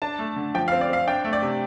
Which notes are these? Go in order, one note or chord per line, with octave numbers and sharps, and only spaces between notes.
D4 A5
A3
D3
F3 G5
F5
C4
D5
C4 F5
D4 G5
A3
D5
C3